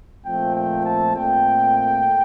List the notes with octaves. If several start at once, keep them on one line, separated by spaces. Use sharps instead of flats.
A#2 F3 A3 C4 G5
G5
A5
A#2 A3 C4 G5